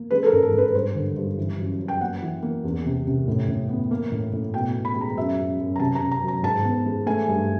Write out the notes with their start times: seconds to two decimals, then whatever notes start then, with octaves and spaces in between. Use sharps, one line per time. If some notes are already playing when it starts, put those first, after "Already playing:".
Already playing: A#3
0.10 G#3 B4
0.23 A4
0.26 A#4
0.33 G#2
0.43 A4
0.54 G#2 B4
0.74 G2 C5
0.95 D3
1.17 G2
1.38 E3
1.59 F#2
1.80 F#2
1.88 G5
2.01 A#3 F#5
2.22 E3
2.42 A#3
2.64 E2
2.85 C3
3.07 C3
3.28 A2
3.48 A2
3.69 B3
3.91 A#3
4.12 A2
4.33 A2
4.54 B2 G5
4.75 B3
4.85 B5
4.96 G#3
5.01 A#5
5.17 F#2 E5
5.38 F#2
5.59 F#2
5.76 A#5
5.80 C3 A5
5.95 A#5
6.01 C3
6.11 A#5
6.23 F#3
6.28 A#5
6.43 G#2 A5
6.65 B3
6.86 G#3
7.06 A3 G#5
7.28 G2